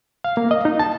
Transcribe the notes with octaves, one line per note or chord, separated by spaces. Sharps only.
F5
A#3
D#5
D#4
A5